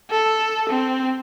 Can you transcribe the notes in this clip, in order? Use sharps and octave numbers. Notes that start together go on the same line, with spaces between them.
A4
C4